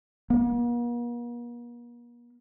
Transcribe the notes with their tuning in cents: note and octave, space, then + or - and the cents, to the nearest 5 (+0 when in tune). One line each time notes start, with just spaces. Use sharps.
A#3 +45